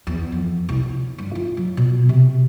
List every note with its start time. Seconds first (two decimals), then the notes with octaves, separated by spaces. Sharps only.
0.07 E2
0.32 F2
0.69 C2
0.83 C#2
1.18 G2
1.35 F4
1.57 F#3
1.77 B2
2.09 C3